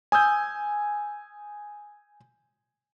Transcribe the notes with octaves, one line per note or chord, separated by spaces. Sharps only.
G#5 D#6 E6 G6